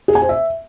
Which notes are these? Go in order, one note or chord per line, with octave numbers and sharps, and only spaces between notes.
G#4
G#5
C5
E5